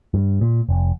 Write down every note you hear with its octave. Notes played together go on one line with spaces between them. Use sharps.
G2
A#2
F1